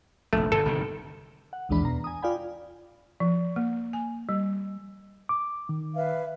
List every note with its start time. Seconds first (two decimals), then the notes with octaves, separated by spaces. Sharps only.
0.33 F1 A#1 A3
0.52 G1 G2 B2 A4
0.65 G1 C3 D#3
1.53 F#5
1.69 A#1 D#2 E3 G#3 D4 B5
1.82 E2 B2 A#5
2.04 G#5 D#6
2.22 F4 D5 F5 G5 G#5 B5
3.20 F3
3.56 A#3
3.93 G#5
4.29 G3
5.29 D6
5.69 D#3
5.95 B4 E5 F5